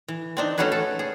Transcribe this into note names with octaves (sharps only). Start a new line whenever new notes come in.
E3
C4 D4 D#4
A3 C#4 D#4 F#4 G#4 B4
A4
G#4